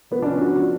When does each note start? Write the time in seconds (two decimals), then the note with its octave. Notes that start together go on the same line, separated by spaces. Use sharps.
0.11 F3 B3
0.22 D4
0.26 F3 C#4
0.40 F3 F#4
0.56 F3